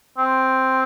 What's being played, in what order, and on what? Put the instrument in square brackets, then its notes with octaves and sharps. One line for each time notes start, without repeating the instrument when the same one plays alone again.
[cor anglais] C4